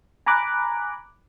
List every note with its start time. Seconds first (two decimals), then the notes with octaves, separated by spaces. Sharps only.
0.26 G#5 A#5 B5 D6 F#6